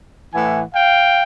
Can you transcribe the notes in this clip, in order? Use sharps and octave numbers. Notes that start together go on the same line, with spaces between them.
A2 E3 F#5 G#5
F5 G5